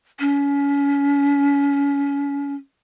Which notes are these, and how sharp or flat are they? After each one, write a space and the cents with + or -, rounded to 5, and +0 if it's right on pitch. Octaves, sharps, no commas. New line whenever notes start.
C#4 +30